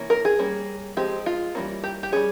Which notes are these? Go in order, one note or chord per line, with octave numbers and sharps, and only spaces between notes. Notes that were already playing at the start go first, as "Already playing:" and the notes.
Already playing: E3 A#3 C#4
A#4
G#4
G3 A#3 C#4
F3 G#3 C4 G4
F4
E3 G3 A#3 C#4
G4
G4
G3 C#4 G#4